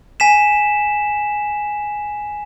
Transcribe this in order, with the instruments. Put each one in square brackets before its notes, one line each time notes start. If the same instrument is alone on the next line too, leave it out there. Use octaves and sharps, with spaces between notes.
[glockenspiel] G#5 B6 E7